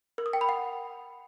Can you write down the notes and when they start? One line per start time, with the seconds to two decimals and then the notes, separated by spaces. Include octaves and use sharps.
0.18 A#4
0.26 D#6
0.33 G5
0.41 B5
0.49 F#5